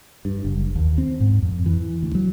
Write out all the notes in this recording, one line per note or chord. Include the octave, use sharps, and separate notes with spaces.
G2
F#1
D#2
C4
G#2
F2
E3
D2
F#3